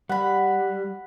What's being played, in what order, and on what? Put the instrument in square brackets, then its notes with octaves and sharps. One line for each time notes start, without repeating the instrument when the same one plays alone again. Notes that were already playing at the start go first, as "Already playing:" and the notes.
[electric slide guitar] G3 [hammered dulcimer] F#5 B5